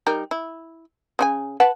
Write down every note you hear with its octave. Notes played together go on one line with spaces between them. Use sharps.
G3 D#4 A#4
E4
C#3 E4 G#5
B4 F#5 A5